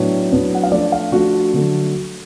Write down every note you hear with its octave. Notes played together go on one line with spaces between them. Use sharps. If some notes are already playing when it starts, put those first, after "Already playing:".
Already playing: A2 F#3 B3 D4 C#5
A2 F#3 B3 D4
F#5
F5
F3 A3 D4 D5
F5
F3 A3 D4 F#4
D3 F#3 A3